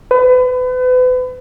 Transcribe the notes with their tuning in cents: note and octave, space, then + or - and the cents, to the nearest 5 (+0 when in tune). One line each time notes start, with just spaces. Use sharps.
B4 +35